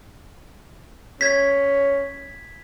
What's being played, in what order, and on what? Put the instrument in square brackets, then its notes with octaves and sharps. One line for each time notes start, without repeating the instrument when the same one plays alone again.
[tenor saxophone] C#4 [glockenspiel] G#6 B6